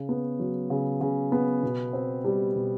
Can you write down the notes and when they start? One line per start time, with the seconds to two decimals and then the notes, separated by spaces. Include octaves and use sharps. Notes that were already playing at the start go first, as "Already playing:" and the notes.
Already playing: C#3
0.09 B3
0.39 F#3
0.70 C#3
1.01 C#3
1.32 B3
1.63 B2
1.93 C4
2.24 G3
2.55 B2